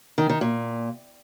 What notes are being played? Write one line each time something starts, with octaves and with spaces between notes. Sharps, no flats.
D#3
D#3
A#2